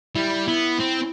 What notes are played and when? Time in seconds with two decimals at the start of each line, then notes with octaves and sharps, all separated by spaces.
0.15 G3 E4
0.48 B3 E4
0.80 C4